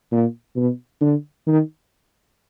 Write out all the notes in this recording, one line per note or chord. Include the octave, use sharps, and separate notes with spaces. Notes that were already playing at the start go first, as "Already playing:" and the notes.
A#2
B2
D3
D#3